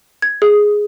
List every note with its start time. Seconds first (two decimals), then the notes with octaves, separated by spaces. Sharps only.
0.22 G#6
0.42 G#4